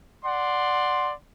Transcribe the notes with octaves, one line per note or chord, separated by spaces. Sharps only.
D5 F#5 C6